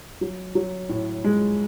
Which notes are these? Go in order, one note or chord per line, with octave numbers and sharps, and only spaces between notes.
F#3
F#3
A2
G#3